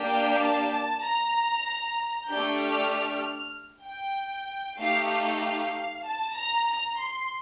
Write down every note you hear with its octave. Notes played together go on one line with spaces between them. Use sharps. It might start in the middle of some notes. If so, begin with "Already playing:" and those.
Already playing: A#3 D4 G4
G5
A5
A5
A#5
A3 D4 G4 G6
F6
G5
A3 D#4 G4 F5
F5
A5
A#5
A#5
C6